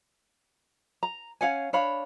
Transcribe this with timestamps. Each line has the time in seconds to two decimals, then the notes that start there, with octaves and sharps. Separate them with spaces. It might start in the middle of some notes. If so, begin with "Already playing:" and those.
1.03 A#5
1.41 C#4 F5 F#5 G#5
1.73 D4 C#5 F5 B5